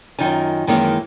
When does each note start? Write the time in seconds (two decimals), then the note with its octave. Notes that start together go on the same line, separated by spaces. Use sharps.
0.19 F#2 D#3 D#4 F4 G#5
0.67 F#2 D#3 E3 G#3 A#3 E4